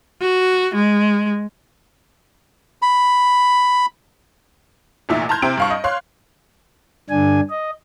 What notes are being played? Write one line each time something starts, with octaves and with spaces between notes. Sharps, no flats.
F#4
G#3
B5
F1 E2 A#2 D#4 E5
A5 A#5 C6 F6 G6 G#6
C3 E4 C5 G5 D7
G2 F5 C#6
D#5
C#5 F5 C6 F#6
G2 D3 D4 G#5
D#5